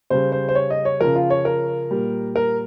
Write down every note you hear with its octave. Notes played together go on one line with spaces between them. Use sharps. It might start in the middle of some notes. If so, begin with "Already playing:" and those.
C#3 G3 C5
C5
C5
C#5
D#5
C#5
C#3 F3 A#4
F4
C#5
A#4
A#2 G3
A#4